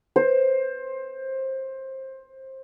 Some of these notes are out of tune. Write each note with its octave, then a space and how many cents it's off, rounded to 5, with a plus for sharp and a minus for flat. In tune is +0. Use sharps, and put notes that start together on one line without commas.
C5 +20